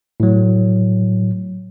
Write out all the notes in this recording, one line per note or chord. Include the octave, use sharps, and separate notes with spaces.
A2 F#3